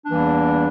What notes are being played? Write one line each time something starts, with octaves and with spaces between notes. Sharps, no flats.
E2 E3 G3 A#3 D4